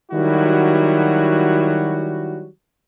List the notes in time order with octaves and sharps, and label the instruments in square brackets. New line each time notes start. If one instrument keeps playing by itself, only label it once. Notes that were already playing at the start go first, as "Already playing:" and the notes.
[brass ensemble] D#3 F#3 G3 E4 F#4